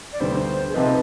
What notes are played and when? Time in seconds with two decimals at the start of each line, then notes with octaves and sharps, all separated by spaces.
0.13 D5
0.20 D2 D3 G3 B3 C5
0.70 G#4
0.74 C3 F3 C4 D#4 B4